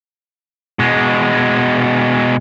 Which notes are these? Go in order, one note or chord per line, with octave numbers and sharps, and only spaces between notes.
B2 G#3